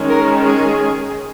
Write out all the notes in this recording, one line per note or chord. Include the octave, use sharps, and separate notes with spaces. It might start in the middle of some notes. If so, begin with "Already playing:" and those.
Already playing: D#3 G#3 C#4
A#4
G#4